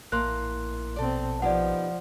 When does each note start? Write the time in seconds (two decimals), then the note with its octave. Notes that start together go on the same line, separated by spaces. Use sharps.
0.12 A#1 A2 A#3 C6 F#6
0.96 B2 C4 A4 D5
1.42 F3 B3 D#4 G4 D5 F#5